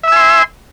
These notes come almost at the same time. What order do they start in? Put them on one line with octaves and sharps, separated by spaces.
E5 E6 G#5 C6